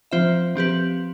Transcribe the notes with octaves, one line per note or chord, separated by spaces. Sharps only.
F3 C4 F4 C5 E5
F3 C4 G4 B4